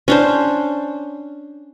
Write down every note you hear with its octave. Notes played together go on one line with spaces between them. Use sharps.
C#4 D4 C5